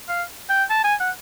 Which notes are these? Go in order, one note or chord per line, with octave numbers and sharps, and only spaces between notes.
F5
G5
A5
G#5
F#5